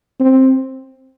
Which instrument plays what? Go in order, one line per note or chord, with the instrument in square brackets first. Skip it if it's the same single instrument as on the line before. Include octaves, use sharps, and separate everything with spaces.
[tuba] C4